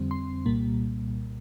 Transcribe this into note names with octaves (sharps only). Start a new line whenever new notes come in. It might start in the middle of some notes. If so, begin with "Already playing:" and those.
Already playing: F2 D3 G3 C4
C6
C2 A#2 G3 A#3